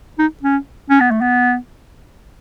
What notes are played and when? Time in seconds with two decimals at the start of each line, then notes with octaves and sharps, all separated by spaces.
0.19 D#4
0.43 C#4
0.90 C#4
1.01 B3
1.11 A3
1.21 B3